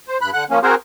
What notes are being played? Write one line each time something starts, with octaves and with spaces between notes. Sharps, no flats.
C5
G2 B5 F#6
D3 F#5 F#6
F3 A#3 C#4
C4 F#4 G#4 A#4 C5